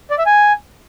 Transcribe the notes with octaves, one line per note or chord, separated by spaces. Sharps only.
D5
E5
G#5